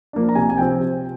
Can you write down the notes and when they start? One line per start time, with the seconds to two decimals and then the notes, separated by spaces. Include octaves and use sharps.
0.13 F3 A#3 D4
0.29 A#5
0.35 C3 G#5
0.50 G#5
0.58 F3 C4 G5
0.81 C3